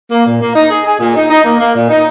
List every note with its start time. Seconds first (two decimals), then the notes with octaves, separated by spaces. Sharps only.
0.11 A#3
0.25 A#2
0.40 A#3
0.55 D#4
0.70 G#4
0.85 G#4
1.00 A#2
1.15 D#4
1.30 D#4
1.44 A#3
1.59 A#3
1.75 A#2
1.89 D#4